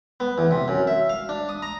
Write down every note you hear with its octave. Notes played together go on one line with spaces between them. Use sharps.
B3
E2
C3
F#2
E5
F5
D4
D#6
A#5